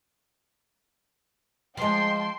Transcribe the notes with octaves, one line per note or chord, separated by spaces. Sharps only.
F3 G#3 G5 A5 C6